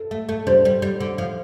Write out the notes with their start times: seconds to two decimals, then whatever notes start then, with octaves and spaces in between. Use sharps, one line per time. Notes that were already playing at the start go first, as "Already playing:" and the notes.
Already playing: A4
0.11 A3
0.29 A3
0.47 G3 C5
0.65 G3
0.82 G3
1.00 D3
1.18 F3